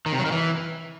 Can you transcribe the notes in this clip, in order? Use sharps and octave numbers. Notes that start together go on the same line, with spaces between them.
D#3
C3
F#3
D#3
E3